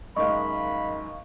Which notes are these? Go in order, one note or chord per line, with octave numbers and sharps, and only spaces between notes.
F#2 D#3 G#3 D#5 F5 B5 C#6